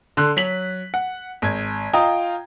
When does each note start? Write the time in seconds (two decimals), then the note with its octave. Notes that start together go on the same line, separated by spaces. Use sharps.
0.17 D3 C6 F#6
0.37 F#3 B6 F#7
0.94 F#5
1.42 G#1 G#6
1.93 F4 D#5 G5 A#5 D#6